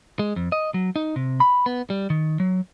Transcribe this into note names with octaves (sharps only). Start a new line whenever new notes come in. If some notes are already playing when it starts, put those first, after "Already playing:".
G#3
F2
D#5
F#3
D#4
C3
B5
B3
G3
D#3
F#3